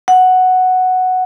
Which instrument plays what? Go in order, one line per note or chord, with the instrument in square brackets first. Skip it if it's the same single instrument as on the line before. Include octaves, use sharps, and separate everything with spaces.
[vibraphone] F#5